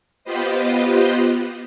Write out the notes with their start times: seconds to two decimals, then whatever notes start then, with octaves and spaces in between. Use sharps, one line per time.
0.24 B3 F4 G4 B4 C5 D#5